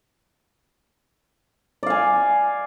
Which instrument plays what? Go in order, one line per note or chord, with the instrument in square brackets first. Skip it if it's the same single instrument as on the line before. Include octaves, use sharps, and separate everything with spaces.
[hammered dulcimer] D5
F5
G#5